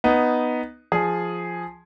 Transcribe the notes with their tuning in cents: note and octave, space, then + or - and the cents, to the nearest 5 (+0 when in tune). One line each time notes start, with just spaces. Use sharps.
B3 +0 D#4 +0
F3 +0 G#4 +0